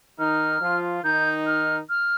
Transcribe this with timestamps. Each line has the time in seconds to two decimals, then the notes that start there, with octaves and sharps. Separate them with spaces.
0.18 D#3 D#4 F6
0.61 F3 F4
1.04 D#3 D#4 G6
1.47 F6
1.90 F6